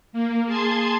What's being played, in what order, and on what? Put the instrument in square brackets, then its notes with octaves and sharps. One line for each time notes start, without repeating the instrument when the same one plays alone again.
[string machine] A#3
G#4 A5 C6 G#6